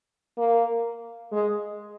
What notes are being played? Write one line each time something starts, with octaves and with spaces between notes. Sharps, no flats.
A#3
G#3